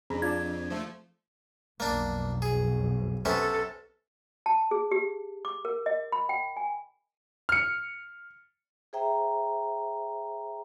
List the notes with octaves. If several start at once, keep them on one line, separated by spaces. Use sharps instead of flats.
F2 C4 D4 G#4 A#5 B5
F4 D5 A5 G#6
F3 A3
B1 F2 A#3 D4
G#4
C3 B3 C#4 A4
A5
G#4
G4
D6
A#4
D#5
B5
G5
G#5
F6 C#7
G#4 C5 E5 G5 A#5